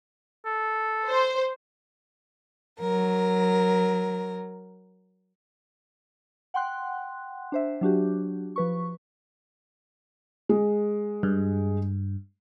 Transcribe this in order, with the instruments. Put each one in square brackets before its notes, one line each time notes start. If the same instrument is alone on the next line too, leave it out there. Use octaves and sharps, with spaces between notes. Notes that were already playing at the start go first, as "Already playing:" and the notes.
[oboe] A4
[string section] C5
[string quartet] F#3 A#4
[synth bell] F#5 G5 C6 F#6
D4 C5 E5
F#3 D4 F#4 G4
F3 B4 C#6
[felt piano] G#3
[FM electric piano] G2